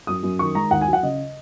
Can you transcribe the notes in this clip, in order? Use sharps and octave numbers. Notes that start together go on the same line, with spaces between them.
F#2 D#6
F#2
D#3 C#6
G#3 A#5
D#2 F#5
G#5
F#3
F#5
C#3 D#5